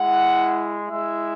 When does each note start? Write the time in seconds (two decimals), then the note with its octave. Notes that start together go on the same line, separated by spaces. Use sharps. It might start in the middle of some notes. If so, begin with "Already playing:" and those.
Already playing: G#3 E4 F#5
0.88 G#3 E4 E5